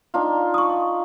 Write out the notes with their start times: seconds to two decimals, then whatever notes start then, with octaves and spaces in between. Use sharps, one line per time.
0.14 D4 D#4 F4
0.54 C#6 D#6